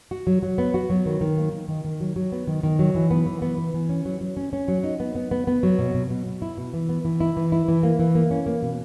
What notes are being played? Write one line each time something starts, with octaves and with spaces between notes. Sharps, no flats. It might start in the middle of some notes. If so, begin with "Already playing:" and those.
F#4
F#3
F#3
B3
F#4
F#3
D#3
D#3
A#3
D#3
D#3
D#3
F#3
F#3
B3
D#3
D#3
F#3
E3
B3
E3
B3
E3
E3
C#4
F#3
F#3
C#4
C#4
F#3
D#4
B3
B3
B3
B3
F#3
B2
B2
B2
B2
E4
B2
E3
B3
E3
E4
E3
E4
E3
A#3
E3
A#3
C#4
A#3
B2